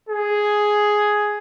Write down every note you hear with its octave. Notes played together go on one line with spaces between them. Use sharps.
G#4